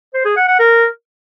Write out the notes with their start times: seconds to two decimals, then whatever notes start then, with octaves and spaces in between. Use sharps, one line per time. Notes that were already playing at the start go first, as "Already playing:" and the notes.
0.14 C5
0.25 G#4
0.37 F#5
0.48 F#5
0.59 A#4